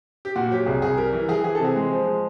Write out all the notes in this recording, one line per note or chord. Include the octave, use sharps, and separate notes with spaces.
G4
A#2 F#4
F#3 G4
C2 G#4
C2 G#4
G3 A#4
E3
E3 G#4
E3 G#4
C3 A4
G#4
G#3
F3
G#3